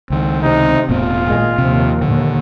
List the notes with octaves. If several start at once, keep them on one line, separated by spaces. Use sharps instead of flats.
C#2 D#3 C4
C3 D#4
E1 A2 B3 F4
G#1 A#2 G#3
D#2 C3 F3
D#2 A#2 D3